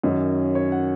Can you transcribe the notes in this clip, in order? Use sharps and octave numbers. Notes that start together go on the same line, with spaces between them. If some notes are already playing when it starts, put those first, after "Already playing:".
F#2 D#3 F#3 C#4 D#5
C#5
F#5